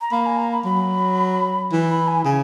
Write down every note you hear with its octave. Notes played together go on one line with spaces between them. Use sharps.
A#5
A#3 B5
G#5
A#5
B5
F#3 B5
E3
B5
G#5
C#3 G#5